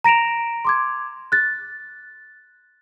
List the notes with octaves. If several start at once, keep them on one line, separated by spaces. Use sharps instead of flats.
A#5 A#6 D7 E7 F7
C6 D6 G#6
F#6 A6